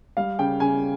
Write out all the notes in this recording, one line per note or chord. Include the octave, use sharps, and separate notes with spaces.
G3 F5
C#3 G5
C#3 G#5